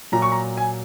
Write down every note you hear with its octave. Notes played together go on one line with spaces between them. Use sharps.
A#2 F#3 A#5
C#6
A#5
G#5